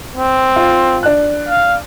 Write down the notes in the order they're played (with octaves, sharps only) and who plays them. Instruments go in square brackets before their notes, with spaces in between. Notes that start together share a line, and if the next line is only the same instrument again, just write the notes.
[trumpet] C4
[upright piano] F4
D4 F#6
[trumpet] F5